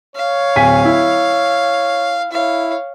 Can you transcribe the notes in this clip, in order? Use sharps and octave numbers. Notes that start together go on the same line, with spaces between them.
C#5 F5
D1 G#5 B6
E4
E4 C#5 F5